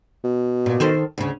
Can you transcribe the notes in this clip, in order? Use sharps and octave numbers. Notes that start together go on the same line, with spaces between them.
B2
A#2
D#3 A4 C5
D2 C#3